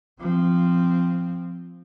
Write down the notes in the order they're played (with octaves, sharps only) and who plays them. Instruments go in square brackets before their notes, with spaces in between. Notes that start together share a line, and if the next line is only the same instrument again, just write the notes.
[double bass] F3 C4